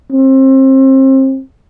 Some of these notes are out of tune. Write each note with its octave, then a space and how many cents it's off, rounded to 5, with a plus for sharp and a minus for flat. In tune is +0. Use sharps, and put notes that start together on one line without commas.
C4 +30